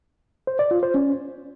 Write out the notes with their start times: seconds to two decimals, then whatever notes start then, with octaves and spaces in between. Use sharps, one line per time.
0.47 C5
0.59 D5
0.71 F4
0.83 C5
0.94 C#4